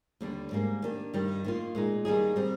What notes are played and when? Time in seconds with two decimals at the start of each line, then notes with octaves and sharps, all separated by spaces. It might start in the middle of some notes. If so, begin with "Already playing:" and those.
0.21 D#2 D3 G3 D4
0.51 G#2 G3 A#3
0.82 D#3 A#3 D4 G4
1.13 G2 D#3 G3
1.44 D#3 A#3 F4
1.75 A#2 G#3 D#4
2.05 D#3 G3 A#3 D#4 G#4
2.36 G3 C4 D#4